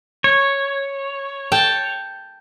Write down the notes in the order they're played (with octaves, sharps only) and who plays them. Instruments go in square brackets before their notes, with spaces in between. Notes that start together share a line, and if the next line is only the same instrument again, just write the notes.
[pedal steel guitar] C#5
[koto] G5 A5